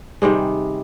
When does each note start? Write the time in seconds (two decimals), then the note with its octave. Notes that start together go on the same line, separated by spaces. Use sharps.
0.22 C3 D#3 G3 G#3